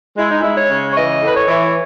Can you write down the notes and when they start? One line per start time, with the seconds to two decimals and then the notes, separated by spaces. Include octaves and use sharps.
0.17 G#3 E4
0.29 D#4
0.41 G#3 E4
0.57 C#5
0.70 C#3
0.91 C#5
0.96 E3 D#5
1.22 A2 B4
1.35 C#5
1.47 E3